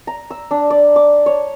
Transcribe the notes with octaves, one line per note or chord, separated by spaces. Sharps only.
A#5
E6
D4
D5
D6
C#5